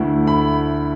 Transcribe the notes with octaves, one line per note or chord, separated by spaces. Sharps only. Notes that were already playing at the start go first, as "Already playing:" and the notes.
Already playing: D2 D3 A3 E4
B5